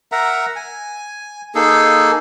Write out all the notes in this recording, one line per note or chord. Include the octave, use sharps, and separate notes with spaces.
A#4 E5 F#5 A#5
G#5
A#3 D#4 G#4 A4